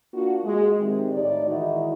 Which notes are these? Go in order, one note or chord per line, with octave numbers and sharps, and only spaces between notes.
A#3 D4 F4 F#4
G#3
C3 D#3 G4
A2 D#4 D5
D#3 E3 G#3 D#4 E4 F#4